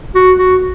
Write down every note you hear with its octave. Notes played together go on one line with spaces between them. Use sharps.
F#4
F#4